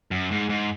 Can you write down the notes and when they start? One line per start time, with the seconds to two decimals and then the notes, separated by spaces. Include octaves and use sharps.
0.11 F#2
0.31 G#2
0.49 G#2